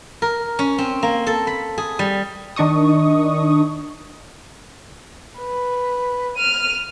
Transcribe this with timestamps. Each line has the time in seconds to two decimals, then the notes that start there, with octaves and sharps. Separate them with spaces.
0.22 A#4
0.59 C#4
0.78 C4
1.03 A#3
1.27 A4
1.47 B5
1.78 G#4
1.99 G3
2.56 D#3 D4 D#5 C#6 D#6
5.39 B4
6.37 F6 D#7